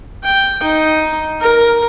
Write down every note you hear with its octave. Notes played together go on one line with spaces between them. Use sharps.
G5
D#4
A#4